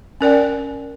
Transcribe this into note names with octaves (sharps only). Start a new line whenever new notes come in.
C#4 A#4 D5 G5